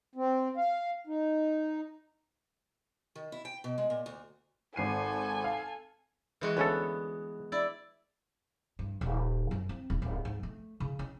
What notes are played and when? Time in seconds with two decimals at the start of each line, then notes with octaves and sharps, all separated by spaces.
0.15 C4
0.57 F5
1.07 D#4
3.15 D#3
3.32 E4
3.45 G5
3.64 B2
3.78 G#3
3.90 A#2
4.06 D2
4.76 G#1 A4 G#5 C7 D#7
5.44 F5
6.41 E3 G#3 F#4
6.57 D2 B3 C#4 A4
7.52 E4 D5
8.79 G2
9.01 D#1
9.51 F#2
9.69 C4
9.90 D#1
10.02 D1
10.25 G#2
10.43 A3
10.80 C#3
10.99 C#4